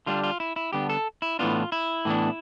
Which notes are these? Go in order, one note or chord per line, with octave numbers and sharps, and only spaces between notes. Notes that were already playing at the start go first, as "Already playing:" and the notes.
D3 G3 B3 D4 F4
F4
E4
E4
D3 G3 B3 D4 G4
A4
E4
A2 E3 B3 D4 F4
E4
A2 E3 B3 D4